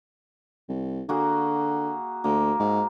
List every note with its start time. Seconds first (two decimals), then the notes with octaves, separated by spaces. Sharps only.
0.69 C2
1.09 D3 A#3 F#4 G#4
2.24 D2 A#3
2.60 G#2